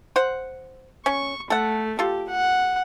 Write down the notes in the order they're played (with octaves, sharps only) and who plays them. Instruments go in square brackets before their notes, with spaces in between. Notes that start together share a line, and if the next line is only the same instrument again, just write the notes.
[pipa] C5 F#5
[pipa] C#4 [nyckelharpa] C#6
[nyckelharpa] A3 [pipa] A4 F#5
[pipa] F4 A4 [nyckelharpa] G4
[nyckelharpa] F#5